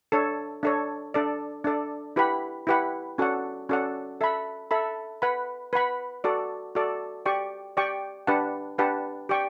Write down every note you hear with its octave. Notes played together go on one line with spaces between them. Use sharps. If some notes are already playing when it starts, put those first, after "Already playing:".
D4 A4 C#5
D4 A4 C#5
D4 A4 D5
D4 A4 D5
E4 G4 B4 F#5 B5
E4 G4 B4 F#5 B5
C#4 F#4 A4 D5 F#5
C#4 F#4 A4 D5 F#5
A4 E5 B5
A4 E5 B5
B4 F#5 B5
B4 F#5 B5
F#4 A4 D5
F#4 A4 D5
G4 D5 G5 C#6
G4 D5 G5 C#6
D4 G4 B4 F#5 A5
D4 G4 B4 F#5 A5
G4 D5 G5 C#6